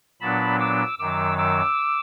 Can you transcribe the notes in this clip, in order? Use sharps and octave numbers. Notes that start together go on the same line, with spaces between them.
A#2 F#3 B3 D4 A5 B5
D6 E6
F#2 D#3 F#3 D6 E6
D6 E6